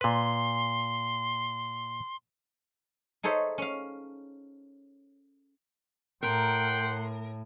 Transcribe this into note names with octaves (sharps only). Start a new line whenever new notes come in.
A#2 B4 C6
D#4 G#4 A4 C5 C#5 E5
C#4 F5
A2 A#4 F#5 G5 C6